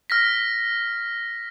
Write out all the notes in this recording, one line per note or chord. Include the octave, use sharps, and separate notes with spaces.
F6 A#6 B6